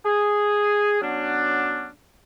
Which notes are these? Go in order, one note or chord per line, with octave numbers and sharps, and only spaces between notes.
G#4
F#3 B3 C#4 D4